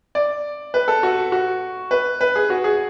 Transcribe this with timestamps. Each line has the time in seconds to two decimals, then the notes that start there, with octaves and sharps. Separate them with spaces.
0.15 D5
0.74 B4
0.88 A4
1.03 F#4
1.32 F#4
1.91 B4
2.21 B4
2.36 G#4
2.50 F#4
2.64 G#4